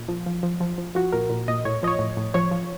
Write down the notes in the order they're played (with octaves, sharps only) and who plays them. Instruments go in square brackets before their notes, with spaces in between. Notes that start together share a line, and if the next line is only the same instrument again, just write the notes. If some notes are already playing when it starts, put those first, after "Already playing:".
Already playing: [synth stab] A#2
F3
F3
F3
F3
F3
F3 F#4
A#2 A#4
A#2
A#2 D#5
A2 C#5
F3 D#5
C#5
A2
A2
F3 C#5
F3